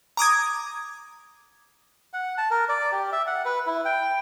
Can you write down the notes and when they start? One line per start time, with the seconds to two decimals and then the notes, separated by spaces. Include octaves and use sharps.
0.17 A#5 D6 D#6 G#6
2.14 F#5
2.38 A5
2.51 A#4
2.69 D5
2.92 G4
3.12 E5
3.27 F#5
3.45 B4
3.66 E4
3.85 G5